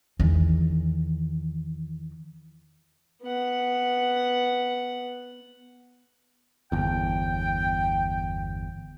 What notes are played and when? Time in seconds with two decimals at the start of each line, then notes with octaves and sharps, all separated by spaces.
0.19 E2 D#3
3.23 B3 F#5
6.72 G1 E2 G5